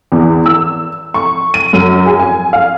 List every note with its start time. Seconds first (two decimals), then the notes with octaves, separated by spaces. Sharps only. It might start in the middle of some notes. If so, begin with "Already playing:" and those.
0.12 E2
0.46 E6
1.14 C#6
1.54 D#7
1.73 F#2
2.06 G#4
2.19 G#5
2.53 F5